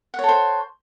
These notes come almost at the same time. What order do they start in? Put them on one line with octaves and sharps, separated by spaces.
F#5 C#5 A4 C5